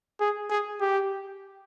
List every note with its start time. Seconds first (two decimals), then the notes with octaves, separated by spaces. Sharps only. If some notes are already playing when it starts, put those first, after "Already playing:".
0.20 G#4
0.50 G#4
0.80 G4